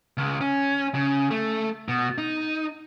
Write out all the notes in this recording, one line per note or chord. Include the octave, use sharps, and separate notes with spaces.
C#2
C#4
C#3
A3
B2
D#4